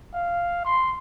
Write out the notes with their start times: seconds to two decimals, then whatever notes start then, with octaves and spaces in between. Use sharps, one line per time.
0.14 F5
0.65 C6